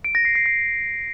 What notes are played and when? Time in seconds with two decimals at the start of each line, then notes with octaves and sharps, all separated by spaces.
0.05 D7
0.15 A#6
0.25 C7
0.35 C7
0.46 C7